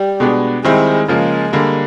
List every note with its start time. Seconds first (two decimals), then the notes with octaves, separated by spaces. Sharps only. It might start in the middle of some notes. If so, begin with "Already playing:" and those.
Already playing: G3
0.20 B2 G#3 B3 D4
0.64 D#3 G3 G#3 C4 E4
1.08 C#3 F3 G#3 A#3
1.53 D3 G3 A#3